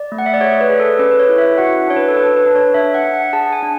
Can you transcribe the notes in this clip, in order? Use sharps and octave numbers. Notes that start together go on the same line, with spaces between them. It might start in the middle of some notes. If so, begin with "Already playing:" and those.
Already playing: D5
A3
F#5
E5
D5
G#4 C#5
B4
G#4
A4
C#4 B4
B4
C#5
E4
E5
F#4 F#5
D4 C#5
B4
A4
D4 B4
B4
D4
C#5
D4 E5
F#5
D4
F#5
G#4 A5
G#5
D4